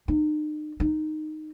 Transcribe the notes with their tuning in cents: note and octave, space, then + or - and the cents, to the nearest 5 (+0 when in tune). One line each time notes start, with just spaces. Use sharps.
D#4 -40
D#4 -10